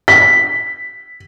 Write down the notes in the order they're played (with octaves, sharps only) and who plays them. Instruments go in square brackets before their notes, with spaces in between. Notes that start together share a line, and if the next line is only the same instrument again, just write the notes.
[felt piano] B6